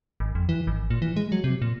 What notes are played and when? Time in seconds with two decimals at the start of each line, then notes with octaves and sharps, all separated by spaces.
0.20 G#1
0.35 F2
0.49 E3
0.67 G#1
0.90 A#2
1.02 E3
1.17 G#3
1.32 F#3
1.44 C3
1.62 A#2